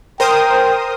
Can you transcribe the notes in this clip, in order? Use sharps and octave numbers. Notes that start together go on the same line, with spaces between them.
A#4 C5 G5 D#6